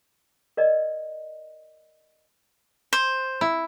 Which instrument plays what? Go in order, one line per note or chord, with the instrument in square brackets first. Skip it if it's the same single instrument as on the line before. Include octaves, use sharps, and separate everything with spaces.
[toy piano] A#4 D5 D#5
[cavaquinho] C5
[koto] E4